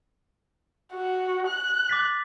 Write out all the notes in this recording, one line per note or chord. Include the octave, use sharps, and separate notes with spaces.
F#4
F#6
D6 A6 B6